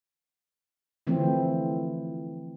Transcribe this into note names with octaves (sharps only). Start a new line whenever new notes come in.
D3 E3 F3 A3 C4